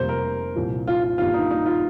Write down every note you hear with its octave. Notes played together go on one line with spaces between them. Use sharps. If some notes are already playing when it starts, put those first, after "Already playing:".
Already playing: F1 F2 C3 G3 A#3 C5
A#4
C2 A#2 F3
F4
F4
G1 G2 D#3 G3 A#3 F4
D#4
D#4
F4